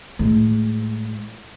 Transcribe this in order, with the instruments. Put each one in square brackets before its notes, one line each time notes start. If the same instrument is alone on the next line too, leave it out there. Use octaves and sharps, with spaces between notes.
[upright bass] A2 G#3